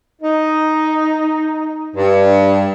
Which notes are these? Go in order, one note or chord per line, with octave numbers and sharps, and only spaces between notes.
D#4
G2